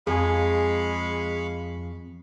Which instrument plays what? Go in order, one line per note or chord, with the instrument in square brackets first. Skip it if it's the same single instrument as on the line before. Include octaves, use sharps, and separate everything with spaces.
[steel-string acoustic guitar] F2 [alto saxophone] G#3 [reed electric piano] G#4 G#5 [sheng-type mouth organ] F5 B5 C#6